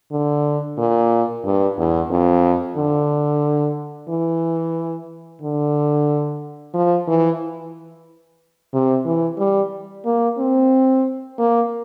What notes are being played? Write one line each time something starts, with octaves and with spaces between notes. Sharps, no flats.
D3
A#2
G2
E2
F2
D3
E3
D3
F3
E3
C3
E3
G3
A#3
C4
A#3